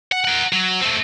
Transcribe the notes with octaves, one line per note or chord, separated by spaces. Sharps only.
F#5
A#4 F#5
F#3
A3 C4